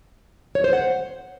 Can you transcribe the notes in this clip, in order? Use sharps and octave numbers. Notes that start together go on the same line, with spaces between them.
C#5
C5
F#5